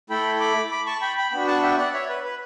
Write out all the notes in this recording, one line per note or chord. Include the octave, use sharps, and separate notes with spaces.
A3 E4 A4 G5 B5
B5 D6
B5 D6
A5 C#6
G5 B5
G5 B5
B3 D4 F#4 G5 B5
F#5 A5
E5 G5
D5 F#5
C#5 E5
B4
B4